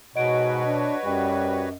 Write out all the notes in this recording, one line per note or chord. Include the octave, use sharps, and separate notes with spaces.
G#2 B2 F#4 B4 C#5 D#5 F#5 D7
D4
F#2 G3